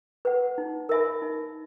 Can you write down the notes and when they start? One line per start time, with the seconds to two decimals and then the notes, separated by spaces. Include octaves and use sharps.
0.25 B4 F#5
0.58 D#4
0.89 A#4 E5 G#5 B5
1.22 D#4